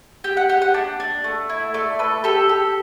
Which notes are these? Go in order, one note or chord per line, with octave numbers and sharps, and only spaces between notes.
G4 G5
F#5
G4 F#5
F#5
D4
D4
A3
E4
A3 D5
A4 B4
G4 A4
G4 A4